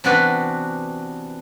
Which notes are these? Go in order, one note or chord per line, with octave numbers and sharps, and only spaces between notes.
C3 E3 B3 D4 F#4 B4